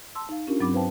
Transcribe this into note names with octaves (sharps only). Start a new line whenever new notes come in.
A5 C6 E6
D#4 F5
C#4 D4 F4 G4 A#4
G2 F#3 C4 B5 D6
B4 C5 F5 G5 A5